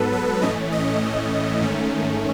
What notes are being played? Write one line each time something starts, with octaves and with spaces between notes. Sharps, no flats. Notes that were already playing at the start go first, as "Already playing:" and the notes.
Already playing: G#2 F#3 B3 A4 B4
B4
A2 E3 A3 C#4 D#5
D#5
G#2 D#3 A3 C#4